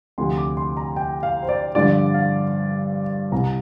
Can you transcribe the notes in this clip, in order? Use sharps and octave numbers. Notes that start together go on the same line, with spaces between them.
D2 C3 F3 C6
D6
C6
A#5
G5
F5
C5
D5
G2 D3 F3 D5
F5
C2 C3 G3 A#5